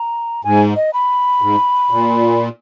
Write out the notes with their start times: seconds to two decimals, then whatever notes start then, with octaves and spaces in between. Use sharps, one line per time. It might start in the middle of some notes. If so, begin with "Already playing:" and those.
Already playing: A#5
0.44 G#2 G#5
0.76 D#5
0.93 B5
1.42 G#2
1.90 A#2